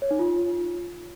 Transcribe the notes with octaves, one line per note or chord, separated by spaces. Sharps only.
C#5
D#4
F4